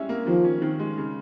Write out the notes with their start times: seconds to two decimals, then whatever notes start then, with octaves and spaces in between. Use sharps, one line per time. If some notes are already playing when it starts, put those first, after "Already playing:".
Already playing: G3 G#3 C#4 E4
0.09 A#3
0.26 D#3 F3
0.44 C#4
0.62 D#3
0.79 G#3
0.97 C#3